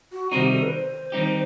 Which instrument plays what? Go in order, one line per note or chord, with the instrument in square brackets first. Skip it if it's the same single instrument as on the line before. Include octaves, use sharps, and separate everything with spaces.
[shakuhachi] F#4
[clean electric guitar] C3 D#3 G3 C4 D#4 [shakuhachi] F#4
[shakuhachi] G4
A4
B4
C5
[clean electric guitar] D#3 G3 C4 D#4 G4